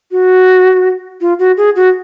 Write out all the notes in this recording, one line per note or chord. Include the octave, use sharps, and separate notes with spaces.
F#4
F4
F#4
G#4
F#4